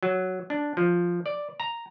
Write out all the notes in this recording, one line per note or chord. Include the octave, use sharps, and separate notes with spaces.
F#3
D4
F3
D5
A#5